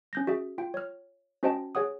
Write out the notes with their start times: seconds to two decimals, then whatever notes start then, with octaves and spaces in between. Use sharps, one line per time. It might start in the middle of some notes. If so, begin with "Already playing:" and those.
0.13 C#4 G6 A#6
0.27 F#4 G#4 E5
0.58 F4 G5
0.74 C#5 F6
1.43 C#4 F#4 C5 D#5 G5 A5
1.75 G#4 C#5 F#5 D#6